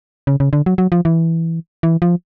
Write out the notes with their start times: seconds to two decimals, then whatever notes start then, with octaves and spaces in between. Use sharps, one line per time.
0.27 C#3
0.40 C#3
0.53 D3
0.66 F#3
0.78 F#3
0.92 F3
1.05 E3
1.83 E3
2.02 F3